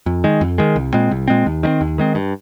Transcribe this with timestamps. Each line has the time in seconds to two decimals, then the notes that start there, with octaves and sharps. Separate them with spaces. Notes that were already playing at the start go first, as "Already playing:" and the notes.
0.06 F2
0.24 D#3 G#3
0.41 F2
0.58 D#3 G#3
0.76 C2
0.93 A#2 G#3 C4
1.11 C2
1.28 A#2 G#3 C4
1.46 D#2
1.63 D#3 G#3 C4
1.81 D#2
1.98 D#3 G#3 C4
2.15 G2